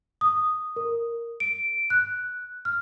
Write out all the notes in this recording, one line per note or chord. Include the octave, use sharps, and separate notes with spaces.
D#6
A#4
D7
F#6
F6